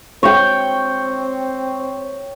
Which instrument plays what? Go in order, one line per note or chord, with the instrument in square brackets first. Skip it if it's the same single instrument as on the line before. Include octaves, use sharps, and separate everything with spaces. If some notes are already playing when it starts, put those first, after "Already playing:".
[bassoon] C4 [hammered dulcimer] C#5 G5